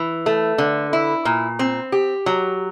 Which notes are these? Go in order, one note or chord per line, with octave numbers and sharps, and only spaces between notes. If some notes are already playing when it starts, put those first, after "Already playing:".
Already playing: E3
A3
D3
E4
A#2
C4
G4
F#3